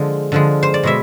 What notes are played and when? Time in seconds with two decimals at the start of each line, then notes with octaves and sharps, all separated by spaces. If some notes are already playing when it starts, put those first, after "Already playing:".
Already playing: D3 F3 G#3
0.32 D3 F3 G#3
0.63 C5
0.74 D5
0.83 B2 G#3 E5